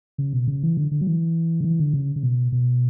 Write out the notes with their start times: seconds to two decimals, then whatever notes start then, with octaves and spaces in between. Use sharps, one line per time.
0.18 C#3
0.33 B2
0.48 C#3
0.63 E3
0.77 D3
0.91 D3
1.01 F#3
1.07 E3
1.61 D3
1.64 E3
1.79 D3
1.93 C#3
2.16 C#3
2.23 B2
2.52 B2